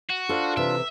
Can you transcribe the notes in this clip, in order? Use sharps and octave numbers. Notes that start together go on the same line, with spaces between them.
F#4
D4 F4 A4 C5
C3 E3 E5